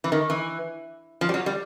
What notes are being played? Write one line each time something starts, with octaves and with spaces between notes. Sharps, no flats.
E3
D#3
E3
F3
G3
F#3
G3